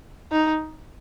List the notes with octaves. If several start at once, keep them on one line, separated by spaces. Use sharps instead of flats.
D#4